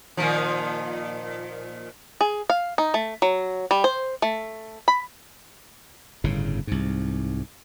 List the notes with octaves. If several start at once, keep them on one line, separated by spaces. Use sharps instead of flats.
A#2 D#3 F3
G#4
F5
D#4
A3
F#3
G3
C5
A3
B5
G1 A2 C#3
C2 G#2